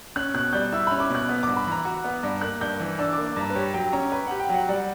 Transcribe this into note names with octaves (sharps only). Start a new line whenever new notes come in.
C#4 F#6
B2 F#6
G3 G6
E4 E6
B5
C#4
D6
B2
F#6
B3
D6
G2
B5
E3
A#5
F#4
B3
G2
A#3 F#6
G2 G6
E3
D4 E6
D6
A#3
D6
G2 A#5
B4
G4 C#5
F#3 G5
C#4 A#5
B4 A#5
F#5
G4
G5
F#3 F#5
G3 F#5